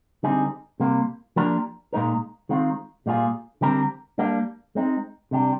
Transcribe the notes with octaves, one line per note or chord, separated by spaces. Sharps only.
D3 G3 C4 D#4 G#4
C3 G3 A#3
F3 A#3 D4 G4 A#4
A#2 G#3 D#4 A#4
D#3 G#3 C4 F4
A#2 G3 A#3 F4 G#4
D3 G3 C4 G4 A#4
G3 A#3 D4
G#3 C4 D#4
C3 G3 D4 G4